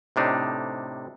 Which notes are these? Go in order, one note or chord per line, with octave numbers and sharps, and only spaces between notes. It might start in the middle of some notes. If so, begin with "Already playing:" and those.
A2 C3 D4 D#4